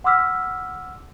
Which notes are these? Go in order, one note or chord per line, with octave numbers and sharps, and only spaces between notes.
F#5 C6 D6 E6 F6 B6